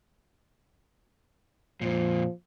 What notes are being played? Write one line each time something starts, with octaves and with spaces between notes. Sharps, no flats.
F2 A#2 F3